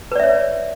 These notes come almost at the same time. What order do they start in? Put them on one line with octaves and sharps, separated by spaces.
B4 D5 E5 C#5